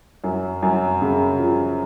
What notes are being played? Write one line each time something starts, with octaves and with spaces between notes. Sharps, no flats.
F#2
F#2
C#3
F3